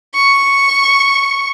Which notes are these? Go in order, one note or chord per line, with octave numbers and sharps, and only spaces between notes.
C#6